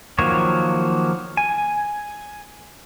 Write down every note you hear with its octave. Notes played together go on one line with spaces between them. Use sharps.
D#3 F3 F#3 A#3 C#5
G#5